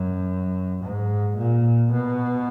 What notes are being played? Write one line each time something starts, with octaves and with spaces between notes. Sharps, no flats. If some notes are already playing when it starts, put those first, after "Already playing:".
Already playing: F#2
G#2
A#2
B2